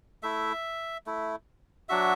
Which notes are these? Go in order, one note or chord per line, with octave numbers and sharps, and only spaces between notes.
A3 E4 E5
A3 E4
F#3 D4 F#4 E5